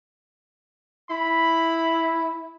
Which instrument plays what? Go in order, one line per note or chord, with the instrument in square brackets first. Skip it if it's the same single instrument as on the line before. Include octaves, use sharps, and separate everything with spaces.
[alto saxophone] E4 [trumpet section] B5